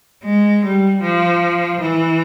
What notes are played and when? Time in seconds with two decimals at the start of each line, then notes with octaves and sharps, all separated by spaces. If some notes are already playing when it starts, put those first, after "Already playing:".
0.24 G#3
0.64 G3
1.02 F3
1.81 E3